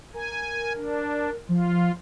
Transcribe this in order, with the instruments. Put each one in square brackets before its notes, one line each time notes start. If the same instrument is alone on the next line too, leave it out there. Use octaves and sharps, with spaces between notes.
[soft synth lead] A#4 [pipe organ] G#5
[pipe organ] D4
[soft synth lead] F3 [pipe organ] F4